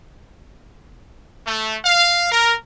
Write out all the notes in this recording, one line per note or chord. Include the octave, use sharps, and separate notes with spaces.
A3
F5
A#4